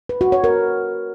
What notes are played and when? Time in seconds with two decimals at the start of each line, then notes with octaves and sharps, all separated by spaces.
0.09 B4
0.21 F#4
0.32 C#5
0.44 A#4